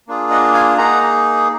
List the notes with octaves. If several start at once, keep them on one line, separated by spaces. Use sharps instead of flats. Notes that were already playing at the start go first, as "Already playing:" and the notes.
A#3 D4 F4 G#4
D#5 F#5
F5 G#5
A#3 D#4 G#4 F#5 A#5